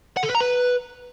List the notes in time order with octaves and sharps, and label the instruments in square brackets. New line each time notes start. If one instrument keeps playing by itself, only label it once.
[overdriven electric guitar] F#5
A4
B4
A#5
B4